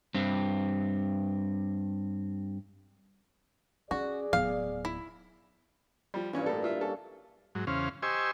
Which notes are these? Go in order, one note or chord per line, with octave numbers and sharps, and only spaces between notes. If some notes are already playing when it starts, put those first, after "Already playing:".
G2 C4
C#4 F#4 G#4 D5
D1 B3 F5
E4
F3 G3
G2 A#2 E3 C#4
A2 A4
E4 F4 E5
C#4 A4
G#2 F#3
E2 C#3 C#4 C5 F5
G4 C5 D#5 G#5 C#6 E6